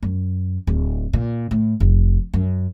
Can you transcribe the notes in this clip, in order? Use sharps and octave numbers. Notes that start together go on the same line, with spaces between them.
F#2
D1
A#2
A2
F1
F#2